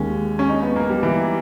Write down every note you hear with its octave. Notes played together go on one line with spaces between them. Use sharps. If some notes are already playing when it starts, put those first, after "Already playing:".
Already playing: D#2 D#3 G#3 C#4
C#4
D#4
B3
A#3
G3
E3